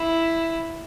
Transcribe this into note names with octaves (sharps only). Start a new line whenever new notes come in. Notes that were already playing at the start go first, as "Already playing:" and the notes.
Already playing: E4